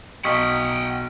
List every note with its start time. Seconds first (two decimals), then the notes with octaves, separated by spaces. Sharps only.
0.25 B1 F#5 G5 C#6 D#6 B6